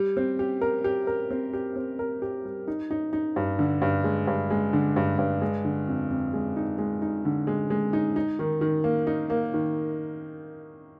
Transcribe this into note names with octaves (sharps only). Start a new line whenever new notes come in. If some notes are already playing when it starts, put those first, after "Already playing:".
Already playing: G3
C4
G4
A#4
G4
A#4
C4
G4
C4
A#4
G4
G3
D#4
D#4
D#4
G2
D3
G2
G#3
G2
G#3
D3
G2
G2
G#3
D3
F2
F2
G#3
D#4
G#3
D#4
D3
G#3
G#3
D#4
D#4
D#3
D#3
A#3
D#4
A#3
D#3